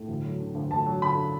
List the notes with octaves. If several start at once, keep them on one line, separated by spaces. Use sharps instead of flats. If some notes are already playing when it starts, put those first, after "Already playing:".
Already playing: A2
D2
F#3
D3
D2
D2 A5
F#3
D3 B5